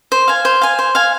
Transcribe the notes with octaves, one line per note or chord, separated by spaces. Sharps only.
C5
F5 G#5
C5
F5 G#5
C5
F5 G#5